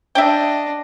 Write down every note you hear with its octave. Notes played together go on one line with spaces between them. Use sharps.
D4 D#5 E5 G5